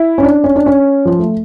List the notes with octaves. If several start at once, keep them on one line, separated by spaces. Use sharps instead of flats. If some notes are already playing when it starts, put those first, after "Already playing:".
Already playing: E4
C#4
D4
C#4
D4
C#4
F3
A3